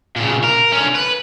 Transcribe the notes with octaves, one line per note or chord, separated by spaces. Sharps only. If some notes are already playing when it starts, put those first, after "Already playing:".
A#2 C#3
A#4
D3 C#4
B4